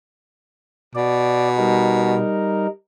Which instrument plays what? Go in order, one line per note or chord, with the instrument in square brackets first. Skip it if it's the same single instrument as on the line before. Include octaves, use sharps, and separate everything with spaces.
[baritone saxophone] B2 [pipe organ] D5
[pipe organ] G3 D#4 A#4